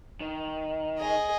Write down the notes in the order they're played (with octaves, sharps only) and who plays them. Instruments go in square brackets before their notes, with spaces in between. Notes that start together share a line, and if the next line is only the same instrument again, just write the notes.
[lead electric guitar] D#3
[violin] G#4 D#5